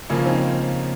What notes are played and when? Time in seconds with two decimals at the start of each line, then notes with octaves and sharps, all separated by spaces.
0.10 C#3 F3 A#3 C#4
0.26 C4 D#4